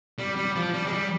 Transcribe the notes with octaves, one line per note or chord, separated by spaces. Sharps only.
G3
G3
F3
G3
G#3
G3